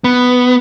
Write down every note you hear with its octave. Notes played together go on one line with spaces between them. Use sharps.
B3